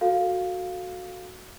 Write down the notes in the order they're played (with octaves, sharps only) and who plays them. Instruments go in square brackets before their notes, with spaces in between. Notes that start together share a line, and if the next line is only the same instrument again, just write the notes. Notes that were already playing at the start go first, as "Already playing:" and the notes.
[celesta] F#4 A4 F5